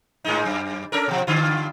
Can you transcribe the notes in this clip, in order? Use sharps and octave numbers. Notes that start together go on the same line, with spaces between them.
G#2 G#3 D#4
F#2
C#4 A4 A#4
B2 F3
G2 D3 F4